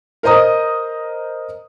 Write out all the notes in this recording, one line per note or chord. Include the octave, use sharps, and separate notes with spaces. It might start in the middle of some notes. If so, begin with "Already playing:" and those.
A#4 C5 D#5 A#5 D#6